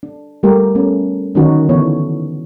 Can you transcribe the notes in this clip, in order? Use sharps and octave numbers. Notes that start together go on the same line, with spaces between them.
D4
G3 A3 G4 A#4
A3 B3 C#4
D3 D#3 F#3 C#4 D#4 F#4
D3 E3 B3 D4 E4 C#5